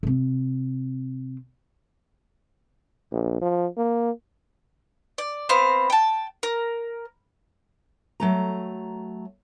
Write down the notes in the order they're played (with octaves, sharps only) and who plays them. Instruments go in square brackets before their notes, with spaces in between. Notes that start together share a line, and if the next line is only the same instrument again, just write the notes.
[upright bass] C3 C4
[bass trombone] A#1
F3
A#3
[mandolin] D5
B3 C4 C5 F5
G5 A5
A#4
[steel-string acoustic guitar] F#3 A3 A#5